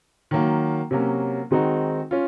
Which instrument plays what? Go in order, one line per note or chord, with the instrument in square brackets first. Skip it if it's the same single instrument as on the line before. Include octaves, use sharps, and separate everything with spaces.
[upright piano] D#3 F#3 A#3
C3 F#3 A#3 C#4 F#4
D#3 G#3 C4 D#4 F#4
C#4 F4